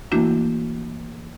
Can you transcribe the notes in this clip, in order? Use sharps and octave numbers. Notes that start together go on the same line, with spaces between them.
E3 A3 A#3 D4 E4 F#4